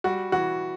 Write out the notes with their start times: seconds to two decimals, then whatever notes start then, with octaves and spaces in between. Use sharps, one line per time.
0.04 G3 F#4
0.32 E3 F#4